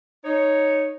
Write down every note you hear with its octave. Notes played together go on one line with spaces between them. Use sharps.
D#4 C#5